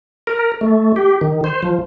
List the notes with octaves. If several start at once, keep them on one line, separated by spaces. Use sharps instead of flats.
A#4
A3
G4
D#3
C5
F3